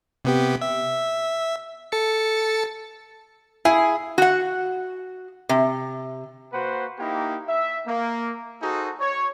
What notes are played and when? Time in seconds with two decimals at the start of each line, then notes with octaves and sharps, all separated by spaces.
0.25 C3 B3 G4
0.62 E5
1.92 A4 A6 C#7
3.65 E4 G#4
4.18 F#4 F#5
5.49 C3
6.52 A#3 F#4 B4 C5 F#5
6.99 A#3 D#4 E4 G4
7.48 E5
7.86 A#3
8.61 D#4 F#4 G#4 A4 C5
9.00 C#5